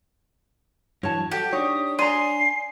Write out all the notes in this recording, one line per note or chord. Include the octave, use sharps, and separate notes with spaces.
G2 E3 F#3 C#5 A5
F#4 G4 A4 G6
D4 D#4 C#5 D#6
D5 G#5 A#5 C6 D#6 C7